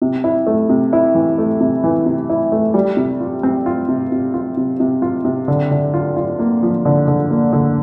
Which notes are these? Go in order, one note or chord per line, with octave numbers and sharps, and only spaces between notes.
C3
E4
A3
C3
E4
E3
A3
C3
E3
C3
E4
A3
G3
C3
F4
C4
F4
C3
C3
F4
C3
C3
F4
C3
D3
D3
F4
F4
A#3
F3
D3
D3
A#3
D3